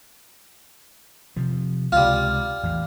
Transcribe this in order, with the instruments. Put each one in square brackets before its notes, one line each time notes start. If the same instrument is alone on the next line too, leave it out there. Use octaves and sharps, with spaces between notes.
[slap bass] C3 F3
[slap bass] C#2 C3 G#3 [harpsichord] G3 F4
[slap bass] A1 E2 A2